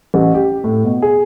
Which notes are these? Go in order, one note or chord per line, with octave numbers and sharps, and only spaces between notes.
A1
G4
A2
B2
G#4